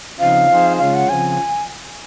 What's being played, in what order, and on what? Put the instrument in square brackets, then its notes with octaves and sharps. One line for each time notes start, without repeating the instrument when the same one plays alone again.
[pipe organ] C#3 F3 C4 D#4 [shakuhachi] F5
[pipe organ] F3 C4 D#4 G#4 C5
[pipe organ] C#3 G#3 C#4 F4 [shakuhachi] F5
[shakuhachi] F#5
[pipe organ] C#3 F3 C4 [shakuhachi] G#5